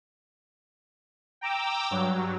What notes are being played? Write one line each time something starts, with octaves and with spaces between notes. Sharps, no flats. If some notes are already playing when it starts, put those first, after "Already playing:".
G5 A#5 D6 E6
G2 F#3